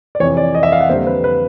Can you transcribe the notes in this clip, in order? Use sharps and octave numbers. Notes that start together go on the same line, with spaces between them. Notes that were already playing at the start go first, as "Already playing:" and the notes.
D5
F2 C3 E3 C#5
D5
D#5
E5
F5
F#5
F2 D3 G3 A#3 C5
B4
B4